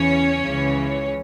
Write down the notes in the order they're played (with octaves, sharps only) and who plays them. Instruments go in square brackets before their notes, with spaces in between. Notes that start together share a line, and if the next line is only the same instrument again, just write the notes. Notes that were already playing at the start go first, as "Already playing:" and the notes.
Already playing: [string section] E2 C#3 E3 C#4 C#5
C#2 C#3 E3